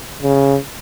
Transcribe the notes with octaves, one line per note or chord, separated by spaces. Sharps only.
C#3